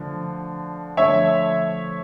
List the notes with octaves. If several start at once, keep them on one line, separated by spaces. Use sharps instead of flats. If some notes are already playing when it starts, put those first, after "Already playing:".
Already playing: D3 F3 A3
D3 F3 A3 C#5 E5